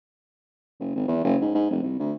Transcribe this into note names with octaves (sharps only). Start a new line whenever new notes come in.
F#1
G#1
E2
F#1
G#2
G#2
F1
C2
D2